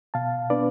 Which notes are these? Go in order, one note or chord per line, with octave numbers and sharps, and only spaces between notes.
B2 F5 A5
B3 D4 B4 D5